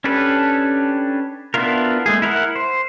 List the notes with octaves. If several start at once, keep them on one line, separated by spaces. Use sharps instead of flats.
C#4 D4 G4 A4 B4
B3 D4 E4 F4 A#4
G#3 A3 G#4
E4 A#4 B4 F#5
C5